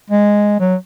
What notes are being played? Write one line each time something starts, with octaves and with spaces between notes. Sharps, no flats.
G#3
F#3